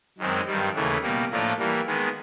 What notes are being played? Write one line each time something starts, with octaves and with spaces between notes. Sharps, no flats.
F#2 D#3 G#3 C4
G2 D#3 G3
D#2 C#3 E3 A3
B2 G3 A#3
A2 F3 A#3 D4 F4
E3 G3 A#3
D#3 G#3 B3